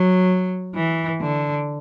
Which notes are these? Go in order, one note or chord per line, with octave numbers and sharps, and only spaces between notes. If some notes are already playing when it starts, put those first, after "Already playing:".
Already playing: F#3
E3
D3